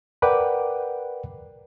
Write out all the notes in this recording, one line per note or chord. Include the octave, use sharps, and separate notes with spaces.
A#4 B4 D5 F#5 G5 D6